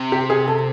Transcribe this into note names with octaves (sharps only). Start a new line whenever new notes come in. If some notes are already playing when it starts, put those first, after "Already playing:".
Already playing: C3
G4
G#4
A4